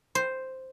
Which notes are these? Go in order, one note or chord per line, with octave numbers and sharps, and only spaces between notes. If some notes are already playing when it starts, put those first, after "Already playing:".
C5